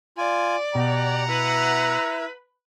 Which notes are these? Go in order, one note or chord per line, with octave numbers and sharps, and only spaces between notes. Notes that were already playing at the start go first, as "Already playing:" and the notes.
F4 D5 G#5
B2 G4 F#5 A#5
E4 B4 E5